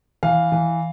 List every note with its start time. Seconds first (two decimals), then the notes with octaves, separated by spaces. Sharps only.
0.23 E3 F5
0.52 E3